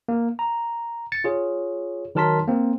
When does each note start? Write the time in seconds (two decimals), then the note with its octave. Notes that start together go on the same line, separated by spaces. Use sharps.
0.08 A#3
0.39 A#5
1.12 A6 C#7
1.24 F4 G#4 C#5
2.15 D#3 F#3 A#4 A5 C6 B6
2.47 A#3 C4